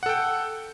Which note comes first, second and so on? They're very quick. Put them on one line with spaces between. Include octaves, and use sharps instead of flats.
F#5 A4 G5